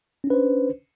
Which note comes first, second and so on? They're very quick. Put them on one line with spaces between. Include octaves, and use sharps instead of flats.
C#4 D4 B4 C5